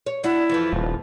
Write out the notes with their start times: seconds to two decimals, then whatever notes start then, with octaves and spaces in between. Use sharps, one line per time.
0.06 C#5
0.24 D4 E4 F#4
0.49 F2 E3 F3
0.73 D#1